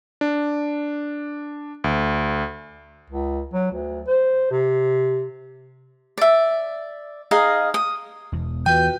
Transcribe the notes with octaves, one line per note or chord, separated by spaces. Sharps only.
D4
D2
C#2
F#3
D2
C5
C3
D5 E5
D#4 G#4 D#5 F5
D#6
E1 E2
E2 E3 F4 F#4 B4 G5 G6